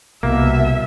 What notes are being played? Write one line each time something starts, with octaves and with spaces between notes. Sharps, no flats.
C2 B2 A#3 E5